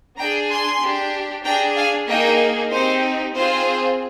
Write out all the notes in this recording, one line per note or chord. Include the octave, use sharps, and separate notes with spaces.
D4 G#4 G5 A#5
G#5 C6
D4 G4
D4 G#4 G5 A#5
F5 G#5
A#3 D#4 G#4 D#5 G5
C4 D#4 G4 C5
C4 F4 G#4 C5